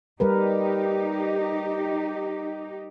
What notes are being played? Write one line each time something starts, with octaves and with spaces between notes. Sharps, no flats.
G3 D#4 G4 A#4 B4